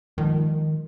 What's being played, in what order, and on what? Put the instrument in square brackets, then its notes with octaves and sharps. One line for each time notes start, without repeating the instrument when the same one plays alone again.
[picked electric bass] G#2 F3 [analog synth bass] D#3